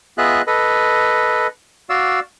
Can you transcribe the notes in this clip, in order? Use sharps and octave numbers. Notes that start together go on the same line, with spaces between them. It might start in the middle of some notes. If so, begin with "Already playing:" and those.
B3 F4 G#4 D#5 E5 F#6
A4 B4 D#5
F#4 D5 F5 E6